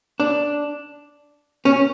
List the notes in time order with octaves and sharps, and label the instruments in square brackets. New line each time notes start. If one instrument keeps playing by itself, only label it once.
[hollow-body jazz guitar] D4
C#4